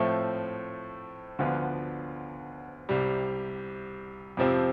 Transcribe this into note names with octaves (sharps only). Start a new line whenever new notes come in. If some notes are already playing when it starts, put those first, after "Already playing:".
Already playing: A2 F3 A3 C4
D2 D3 F3 B3 F4
C2 C3 G3
F2 C3 F3 C4